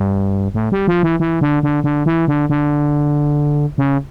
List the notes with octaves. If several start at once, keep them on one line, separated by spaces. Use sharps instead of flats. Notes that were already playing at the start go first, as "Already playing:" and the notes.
Already playing: G2
A2
G3
F3
E3
E3
D3
D3
D3
E3
D3
D3
C#3